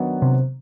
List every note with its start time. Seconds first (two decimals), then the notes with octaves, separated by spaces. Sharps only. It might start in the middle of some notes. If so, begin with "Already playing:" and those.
Already playing: D#3 F#3 B3 D4
0.22 C3